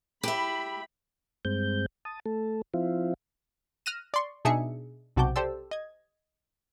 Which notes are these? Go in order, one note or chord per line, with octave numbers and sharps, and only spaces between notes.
G4 E5 B5
G2 G#3 C4 G6
A5 D#6
A3 A4
F3 C4 E4 F4
F6 F#6 A#6 D#7 E7
D5 C6 C#6
B2 D4 D#4 G#4 E5 C#7
B1 C3 F#4 A5 D6 G6
G4 A4 C5 D5 A5 E6
D#5 G#6